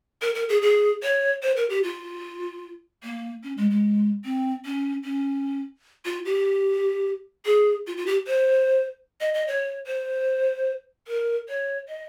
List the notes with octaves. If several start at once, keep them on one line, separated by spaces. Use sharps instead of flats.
A#4
A#4
G#4
G#4
C#5
C5
A#4
G4
F4
A#3
C#4
G#3
G#3
C4
C#4
C#4
F4
G4
G#4
F4
F4
G4
C5
D#5
D#5
C#5
C5
A#4
C#5
D#5